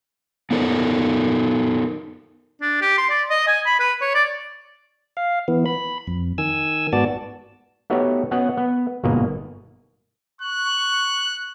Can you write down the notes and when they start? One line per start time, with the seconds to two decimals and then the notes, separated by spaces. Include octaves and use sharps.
0.51 B3 D#4 A4 A#4
2.62 D4
2.82 G4
2.98 C6
3.10 D5
3.30 D#5
3.48 G#5
3.66 B5
3.80 B4
4.02 C#5
4.15 D5
5.17 F5
5.48 E3 B3
5.66 B5
6.07 F2
6.38 D#3 G#5 E6
6.93 G#2 B3 F#4 D5 A5
7.90 A3 B3 D#4 F#4 G4 C#5
8.31 B3 C#4 F#4 D#5 F#5
8.57 B3
9.03 G1 G#2 B2 A#3 D#5
10.42 C#6 F#6